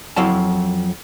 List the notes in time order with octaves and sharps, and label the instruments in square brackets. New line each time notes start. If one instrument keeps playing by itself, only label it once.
[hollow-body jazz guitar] F2 F#3 E4 F5 A5